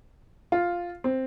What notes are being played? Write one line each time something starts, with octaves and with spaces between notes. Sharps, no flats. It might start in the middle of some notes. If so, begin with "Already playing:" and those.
F4
C4